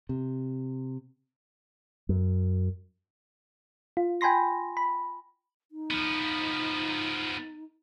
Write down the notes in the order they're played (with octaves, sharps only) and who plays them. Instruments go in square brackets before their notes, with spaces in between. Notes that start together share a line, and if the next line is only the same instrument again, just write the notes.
[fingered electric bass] C3
[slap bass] F#2
[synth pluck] F4
G5 G#5 B5 C6 A#6
B5
[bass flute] D#4
[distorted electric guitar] F3 B3